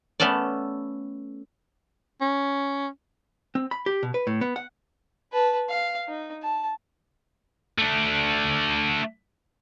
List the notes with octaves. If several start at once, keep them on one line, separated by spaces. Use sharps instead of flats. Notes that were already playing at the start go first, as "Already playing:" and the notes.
A3 B3 C#4 A4 D5
C#4
C4
B5
G4
B2
B4
A2
B3
F#5
B4 A5
F5
D#4
A5
A3 D4